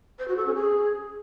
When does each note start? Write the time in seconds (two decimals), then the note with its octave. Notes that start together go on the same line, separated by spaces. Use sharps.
0.19 C5
0.28 F#4
0.37 A4
0.46 C#4
0.55 G#4